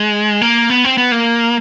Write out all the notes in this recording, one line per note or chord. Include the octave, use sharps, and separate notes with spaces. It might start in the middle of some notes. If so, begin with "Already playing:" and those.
Already playing: G#3
A#3
B3
C4
B3
A#3